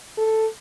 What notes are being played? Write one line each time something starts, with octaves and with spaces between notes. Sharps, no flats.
A4